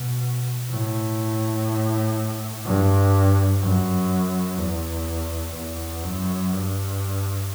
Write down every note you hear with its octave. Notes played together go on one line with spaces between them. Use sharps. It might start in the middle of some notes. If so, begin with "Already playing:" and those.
Already playing: B2
A2
G2
F#2
E2
E2
F#2
G2